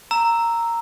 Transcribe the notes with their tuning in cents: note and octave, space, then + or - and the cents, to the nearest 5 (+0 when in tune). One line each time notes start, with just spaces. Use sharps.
A#5 -10 E6 +0